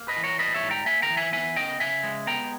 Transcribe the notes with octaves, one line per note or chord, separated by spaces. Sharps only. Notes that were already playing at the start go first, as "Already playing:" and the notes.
Already playing: A#3
B4 D#5
E3
A#4 C#5
G3 B4 D#5
C#5 E5
G#2
G5 A#5
A#3 E5 G#5
G5 A#5
E3
E5 G#5
B3 E5 G#5
C#3 D#5 G5
C#3 E5 G#5
G#3
B3 G5 A#5